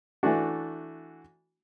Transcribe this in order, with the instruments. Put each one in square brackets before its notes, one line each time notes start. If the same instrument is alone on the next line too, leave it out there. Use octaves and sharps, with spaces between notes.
[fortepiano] E3 A3 D4 F#4